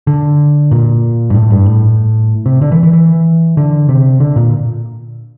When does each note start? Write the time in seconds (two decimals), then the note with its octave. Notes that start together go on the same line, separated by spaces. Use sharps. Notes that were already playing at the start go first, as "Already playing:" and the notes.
0.07 D3
0.71 A#2
1.30 G2
1.34 A2
1.50 G2
1.66 A2
2.46 C3
2.61 D3
2.72 E3
2.83 E3
2.93 E3
3.57 D3
3.89 C3
4.20 D3
4.36 A#2